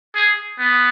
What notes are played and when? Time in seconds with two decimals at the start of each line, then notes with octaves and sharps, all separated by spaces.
0.15 G#4
0.59 B3